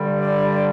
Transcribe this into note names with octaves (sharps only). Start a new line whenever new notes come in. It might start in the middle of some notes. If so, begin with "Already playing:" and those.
Already playing: G2 D3 G3
D5